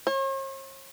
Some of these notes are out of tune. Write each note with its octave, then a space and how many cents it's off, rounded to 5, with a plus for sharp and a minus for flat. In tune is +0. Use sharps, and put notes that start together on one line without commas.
C#5 -45